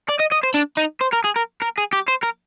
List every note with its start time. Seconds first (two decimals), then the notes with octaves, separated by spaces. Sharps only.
0.09 D5
0.19 D#5
0.31 D#5
0.43 C5
0.54 D4
0.77 D#4
1.01 C5
1.12 A#4
1.24 G#4
1.36 A#4
1.62 A#4
1.78 G#4
1.93 G4
2.08 C5
2.23 A#4